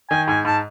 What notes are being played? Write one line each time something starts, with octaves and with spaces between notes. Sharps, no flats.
D#3 G#5
G#2 G#5
G#2 A5